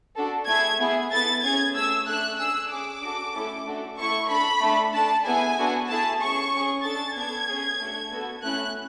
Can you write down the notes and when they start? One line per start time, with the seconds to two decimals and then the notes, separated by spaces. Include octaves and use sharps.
0.16 D4 F#4 A4
0.47 A3 E4 G#4 G#6
0.79 B3 E4 G#4
1.11 B3 E4 A4 A6
1.43 C#4 G#4 G#6
1.75 A3 C#4 G#4 E6
2.07 A3 D4 A4 F#6
2.39 D4 G#4 E6
2.71 C#4 G#4 D6
3.02 D4 F#4 A4
3.34 A3 C#4 E4 A4
3.66 A3 D4 F#4 A4
3.98 A3 E4 A4 C#6
4.29 D4 A4 B5
4.62 A3 D4 A4
4.94 D4 A4 A5
5.26 B3 E4 G#4 G#5
5.58 B3 D4 F#4 A4
5.89 A3 E4 G#4 A5
6.21 C#4 G#4 C#6
6.52 C#4
6.57 G#4
6.84 D4 A4 A6
7.17 B3 D4 A4 G#6
7.48 C#4 G#4
7.80 A3 D4 F#4
8.12 B3 F#4 A4
8.44 A3 C#4 E4 F#6